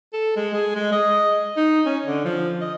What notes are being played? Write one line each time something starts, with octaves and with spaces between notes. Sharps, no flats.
A4
G#3
G#4
G#3
D#5
D#4
C#4
D3
F3
D#5